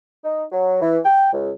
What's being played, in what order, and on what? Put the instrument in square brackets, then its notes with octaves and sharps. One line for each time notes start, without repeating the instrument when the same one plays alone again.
[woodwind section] D#4
F#3
E3
G5
C#2